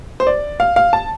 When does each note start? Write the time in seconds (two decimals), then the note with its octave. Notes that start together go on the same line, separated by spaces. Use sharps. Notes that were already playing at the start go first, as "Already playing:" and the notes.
0.20 C5
0.27 D5
0.60 F5
0.76 F5
0.93 A5